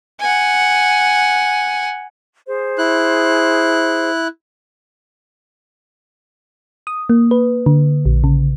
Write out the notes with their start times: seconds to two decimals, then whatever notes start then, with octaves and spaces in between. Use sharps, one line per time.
0.20 F#5 G#5
2.47 G#4 C5
2.78 E4 F#6
6.87 D#6
7.09 A#3
7.31 B4
7.66 D3
8.06 A#1
8.24 C#3